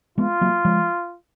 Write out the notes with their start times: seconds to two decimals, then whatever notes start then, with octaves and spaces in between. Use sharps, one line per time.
0.18 G#3 B3 F4
0.41 F#3 A#3
0.65 F3 G#3